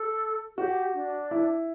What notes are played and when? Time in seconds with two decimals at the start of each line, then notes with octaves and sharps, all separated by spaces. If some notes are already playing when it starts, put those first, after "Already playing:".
Already playing: A4
0.57 F#4 G4
0.94 D4
1.31 E4